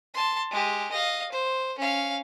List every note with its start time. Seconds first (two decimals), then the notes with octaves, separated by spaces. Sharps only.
0.14 A5 C6
0.51 G#3 G4
0.92 D#5 F5
1.32 C5
1.79 C#4 F5